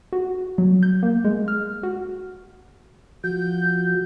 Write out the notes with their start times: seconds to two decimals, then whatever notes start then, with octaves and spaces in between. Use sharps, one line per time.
0.13 F#4
0.58 F#3
0.83 G6
1.03 A#3
1.25 G#3
1.48 F6
1.83 F#4
3.24 F3 F#4 G6